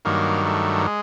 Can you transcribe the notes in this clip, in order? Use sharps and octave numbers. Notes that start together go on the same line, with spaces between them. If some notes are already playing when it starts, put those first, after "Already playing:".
G2 D#3 F#3 A#3
A3
G#3